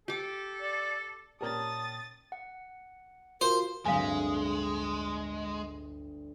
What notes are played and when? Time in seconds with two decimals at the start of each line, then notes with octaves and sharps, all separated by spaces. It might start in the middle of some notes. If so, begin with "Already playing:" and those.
0.08 G4 A4 D6
0.62 D5
1.41 A#2 C#4 G4 A#4 D5 A5 D#6 A6
2.32 F#5
3.41 F4 F#4 A#4 C5
3.85 D1 G1 D2 F#3 G#3 C4 F5 G#5